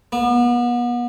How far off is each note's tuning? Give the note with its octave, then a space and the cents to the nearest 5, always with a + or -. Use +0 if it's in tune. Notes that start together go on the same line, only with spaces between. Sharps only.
B3 -35